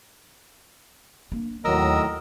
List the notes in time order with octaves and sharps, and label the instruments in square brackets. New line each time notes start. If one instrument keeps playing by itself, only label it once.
[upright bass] A#3 D4
[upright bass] D#2 [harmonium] A2 D#3 F#3 [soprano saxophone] A#4 [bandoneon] D#5 E6